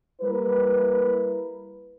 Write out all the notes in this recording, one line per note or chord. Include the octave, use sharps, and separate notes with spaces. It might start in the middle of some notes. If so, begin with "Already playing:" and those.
G3 A#3 E4 A#4 B4